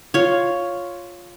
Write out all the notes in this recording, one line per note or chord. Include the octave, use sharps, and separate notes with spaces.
F4 C#5